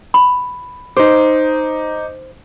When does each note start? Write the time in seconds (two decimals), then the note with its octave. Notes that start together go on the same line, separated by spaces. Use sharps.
0.14 B5
0.97 D#4 C5 D6